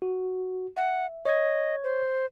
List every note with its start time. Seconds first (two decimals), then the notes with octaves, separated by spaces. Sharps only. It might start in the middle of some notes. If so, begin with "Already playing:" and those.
0.02 F#4
0.77 E5 F#5
1.25 C#5 D#5 G#6
1.84 C5